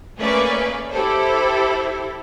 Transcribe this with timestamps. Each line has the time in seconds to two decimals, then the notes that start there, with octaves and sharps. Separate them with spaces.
0.19 A3 A#3 C#4 G#4 B4 D5
0.90 E4 G4 A4 C5